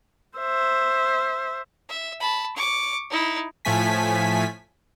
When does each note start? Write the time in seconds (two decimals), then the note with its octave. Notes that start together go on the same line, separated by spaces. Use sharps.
0.38 C5 E5
1.89 E5
2.20 A5 B5
2.56 C#6 D6
3.10 D#4 E4
3.65 A2 F3 A3 G#5 B6